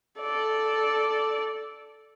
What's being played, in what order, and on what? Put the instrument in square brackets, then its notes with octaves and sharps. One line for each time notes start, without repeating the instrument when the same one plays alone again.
[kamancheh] A4 D5